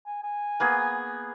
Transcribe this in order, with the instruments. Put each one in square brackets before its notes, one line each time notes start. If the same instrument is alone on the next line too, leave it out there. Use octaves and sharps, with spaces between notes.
[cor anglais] G#5
G#5
[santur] A#3 B3 G#4